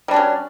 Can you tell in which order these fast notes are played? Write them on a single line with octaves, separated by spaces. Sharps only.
G3 D4 F#3 C#4